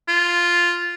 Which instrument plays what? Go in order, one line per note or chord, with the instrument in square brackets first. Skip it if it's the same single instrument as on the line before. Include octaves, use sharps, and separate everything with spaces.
[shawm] F4